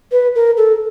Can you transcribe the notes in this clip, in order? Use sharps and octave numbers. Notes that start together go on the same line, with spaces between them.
B4
A#4
A4